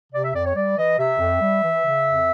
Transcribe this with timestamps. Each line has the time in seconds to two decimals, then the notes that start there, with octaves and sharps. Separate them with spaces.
0.12 C3 D5
0.23 E5
0.34 F2 D5
0.45 C#5
0.55 G3 D5
0.77 E3 D#5
0.98 C3 E5
1.19 F2
1.41 G3
1.63 E3
1.84 C#3
2.06 F2